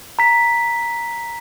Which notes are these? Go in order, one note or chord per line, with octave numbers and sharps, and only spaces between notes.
A#5 B6